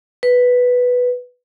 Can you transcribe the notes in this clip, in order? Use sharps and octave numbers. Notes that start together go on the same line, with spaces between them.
B4